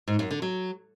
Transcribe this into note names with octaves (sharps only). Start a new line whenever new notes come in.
G#2
F#2
D3
F#3